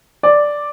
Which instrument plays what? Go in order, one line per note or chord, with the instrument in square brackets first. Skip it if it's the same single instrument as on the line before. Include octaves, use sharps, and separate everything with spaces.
[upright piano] D5